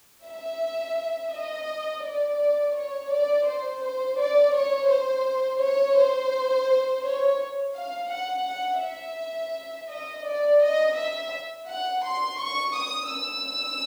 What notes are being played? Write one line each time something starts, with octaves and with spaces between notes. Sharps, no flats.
E5
D#5
D5
C#5
D5
C5
C5
D5
C#5
C5
C#5
C5
C#5
F5
F#5
F#5
E5
D#5
D5
D#5
E5
F#5
C6
C#6
D#6
E6